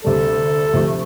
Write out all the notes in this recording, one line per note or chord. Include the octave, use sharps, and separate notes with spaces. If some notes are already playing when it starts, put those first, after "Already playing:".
D2 C3 G3 A4
D2 C3 F3 A3